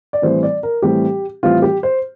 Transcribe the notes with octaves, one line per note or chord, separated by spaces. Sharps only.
D5
A2 E3 G3 C4 C5
D5
A#4
A2 E3 G3 C4 G4
A2 E3 G3 C4 F4
G4
C5